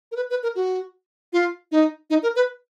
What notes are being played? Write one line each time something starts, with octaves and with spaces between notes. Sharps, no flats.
A#4
B4
B4
A#4
F#4
F4
D#4
D#4
A#4
B4